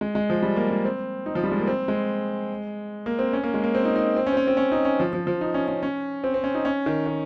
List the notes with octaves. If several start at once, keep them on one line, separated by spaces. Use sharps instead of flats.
G#3
G#3
F3
G3
A#3
G#3
C4
D#4
F3
G3
G#3
A#3
C4
G#3
A#3
C4
C#4
A#3
G#3
A#3
C4
D#4
D#4
C4
C#4
C4
C#4
C4
C#4
D#4
C#4
F3
F3
F3
D#4
C#4
C#4
C#4
C4
C4
C#4
D#4
C#4
D#3
D#3